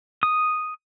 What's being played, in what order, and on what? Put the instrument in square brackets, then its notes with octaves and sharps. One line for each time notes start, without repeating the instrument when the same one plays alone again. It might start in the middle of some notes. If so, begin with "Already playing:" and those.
[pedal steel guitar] D#6